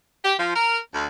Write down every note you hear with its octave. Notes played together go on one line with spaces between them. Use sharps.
G4
F3
A#4
D2